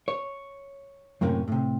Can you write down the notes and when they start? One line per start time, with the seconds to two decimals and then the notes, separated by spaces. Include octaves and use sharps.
0.08 C#5
1.21 F#2 A2 C3 A#3 C#4
1.48 A2 C3